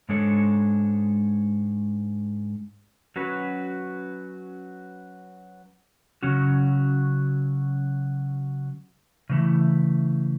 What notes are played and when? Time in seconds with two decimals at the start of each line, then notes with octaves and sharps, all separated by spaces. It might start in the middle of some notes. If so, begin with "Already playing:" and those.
0.09 G#2 G#3 D4 A4 C#5
3.16 F#3 C#4 F#4 B4
6.23 C#3 F#3 C#4 F#4
9.30 C#3 E3 A3 E4